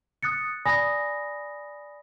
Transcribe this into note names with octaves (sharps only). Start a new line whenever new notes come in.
D#6 F#6 A6 C#7
D5 G#5 B5 D#6 A#6